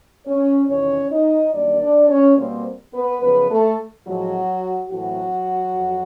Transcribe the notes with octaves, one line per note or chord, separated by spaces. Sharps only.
C#4 C#5
E2 C3 D#3 C#4 C#5
D#4 D#5
F#2 D#3 G3 A#3 D4 D5
D4 D5
C#4 C#5
B2 G3 A#3 C4 C5
B3 B4
F#2 C#3 F3 B3 B4
A3 A4
A2 F3 F#3 G#3 C4 F#4
A2 E3 F#3 A3 C4 F#4
F2